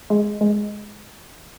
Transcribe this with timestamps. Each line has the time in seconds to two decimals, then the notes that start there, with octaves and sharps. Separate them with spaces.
0.10 G#3
0.41 G#3